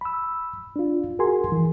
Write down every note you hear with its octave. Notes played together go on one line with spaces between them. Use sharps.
B5 E6
D4 F4
F#4 G#4 A#4 G#5 C6
E3